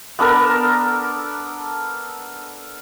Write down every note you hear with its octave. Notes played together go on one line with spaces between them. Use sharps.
B3 D4 A4 A#4